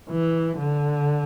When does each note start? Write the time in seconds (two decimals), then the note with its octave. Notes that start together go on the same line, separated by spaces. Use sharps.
0.10 E3
0.58 D3